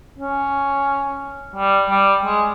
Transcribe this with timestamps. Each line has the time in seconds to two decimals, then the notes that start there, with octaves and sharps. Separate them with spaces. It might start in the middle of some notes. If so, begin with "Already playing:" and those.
0.18 C#4
1.56 G3
1.90 G3
2.25 G#3